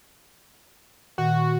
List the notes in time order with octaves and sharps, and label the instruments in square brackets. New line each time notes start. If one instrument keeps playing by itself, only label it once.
[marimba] A#2 D#3 [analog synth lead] F#4